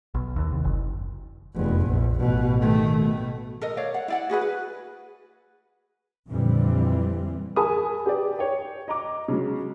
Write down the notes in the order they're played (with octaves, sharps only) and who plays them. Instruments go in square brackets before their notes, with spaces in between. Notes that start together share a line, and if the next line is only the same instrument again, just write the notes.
[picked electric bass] B1
D#2
C2
F#1
[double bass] F1 E2
A#1
A1 B2
D#3 A3
B2 A3
[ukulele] A4 A#4 D#5
C#5 D5 F5
F#5
E4 D5 F#5
F#4 G#4 B4 F#5
B4
[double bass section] F2 A#2 D3 E3 G3 C4
[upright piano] G#4 A#4 G#5 A5 B5 D#6
G4 G#4 B4 D5
C#5 G5
D#5 A#5 D6
C#3 F#3 G#3